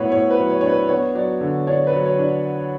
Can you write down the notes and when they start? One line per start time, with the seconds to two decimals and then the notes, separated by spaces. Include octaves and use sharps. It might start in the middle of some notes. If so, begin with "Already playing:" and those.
Already playing: A2 F#3 B3 B4 C#5 F#5
0.11 A2 C#5
0.31 B4
0.37 F#3
0.50 C#5
0.61 D4 C#5
0.69 B4
0.89 B3 C#5
1.15 F#3 D5
1.41 D3
1.67 D4 C#5
1.87 B4
1.93 F#3
2.06 C#5
2.19 D4